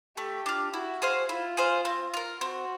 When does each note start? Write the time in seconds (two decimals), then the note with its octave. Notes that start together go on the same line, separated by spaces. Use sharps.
0.17 A3 G4
0.46 D4 F4
0.74 E4 F#4
1.02 G#4 C5 F5
1.29 E4 F4
1.57 G#4 C5 F5
1.85 C4
2.14 F4 A#4
2.41 C4 F#4